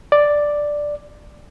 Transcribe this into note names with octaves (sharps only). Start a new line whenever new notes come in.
D5